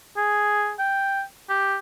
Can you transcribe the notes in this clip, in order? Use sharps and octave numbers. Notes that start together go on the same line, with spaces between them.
G#4
G5
G4